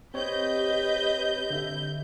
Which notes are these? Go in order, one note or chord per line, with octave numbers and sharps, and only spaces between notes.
C4 G4 B4 C#5 D#5 G6
D3 E5